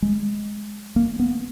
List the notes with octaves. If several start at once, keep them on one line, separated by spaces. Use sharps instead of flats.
G#3
A#3
B3